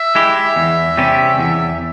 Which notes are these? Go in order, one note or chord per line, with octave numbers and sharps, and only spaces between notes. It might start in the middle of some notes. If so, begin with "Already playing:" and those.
Already playing: E5
G#3 E4 G4
E2
C3 G3 C#4 G4
E2 E5